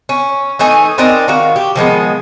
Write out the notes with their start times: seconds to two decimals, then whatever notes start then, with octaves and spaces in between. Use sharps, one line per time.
0.09 C#4
0.59 E3 A3 D#4 G#5
0.98 C4 D4 D#4 A#4
1.28 D#3 F#4 F5
1.56 G4
1.76 D#3 F3 G#3 B3